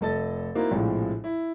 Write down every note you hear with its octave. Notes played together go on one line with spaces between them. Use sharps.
F1 A3 A4 D#5 A5 A6
A#3 C4 D#4 E4 F#4
A#1 A2 C3 F3 G#3
E4